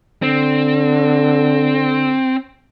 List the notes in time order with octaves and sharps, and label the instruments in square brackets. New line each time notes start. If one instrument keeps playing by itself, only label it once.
[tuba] D3 [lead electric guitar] C4